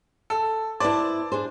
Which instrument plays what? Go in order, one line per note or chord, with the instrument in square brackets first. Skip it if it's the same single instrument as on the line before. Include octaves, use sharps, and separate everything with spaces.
[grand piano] A4
[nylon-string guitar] E4 B4 C5 [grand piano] D5 A5
[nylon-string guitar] D4 G#4 C5